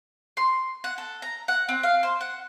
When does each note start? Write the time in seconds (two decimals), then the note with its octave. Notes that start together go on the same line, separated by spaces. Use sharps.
0.37 C6
0.84 F#5
0.98 A4
1.22 A#5
1.48 F#5
1.69 C4
1.83 F5
2.03 C5
2.21 F#5